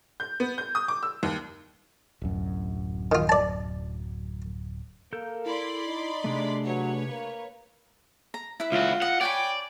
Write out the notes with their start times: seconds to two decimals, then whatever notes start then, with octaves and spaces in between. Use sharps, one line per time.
0.20 G6
0.40 B3
0.58 G6
0.75 D#6
0.88 D6
1.03 E6
1.23 D#2
2.22 D1 F#2
3.12 D#3 F4
3.29 D5 A5
5.13 A#3 A4 A#4 G6
5.46 E4 D5 B5 C6
5.87 D#4
6.24 C3 A3 D4 G#4
6.65 F#3 B4 C#5
7.09 A#3
8.34 A#5
8.60 E4 B4 E5
8.72 C#2 F4 F#4
9.02 D#5 F#5
9.21 C#5 D5 G5 G#5 B5